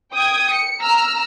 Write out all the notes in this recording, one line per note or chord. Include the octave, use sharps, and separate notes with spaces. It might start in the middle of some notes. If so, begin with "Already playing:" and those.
G5 D#6 G#6
C#7
A#5 E6 F6